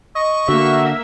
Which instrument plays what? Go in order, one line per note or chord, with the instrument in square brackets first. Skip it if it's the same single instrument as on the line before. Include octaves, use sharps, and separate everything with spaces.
[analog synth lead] D#5 [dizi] C#6
[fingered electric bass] D3 [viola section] A#3 E5 [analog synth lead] F#4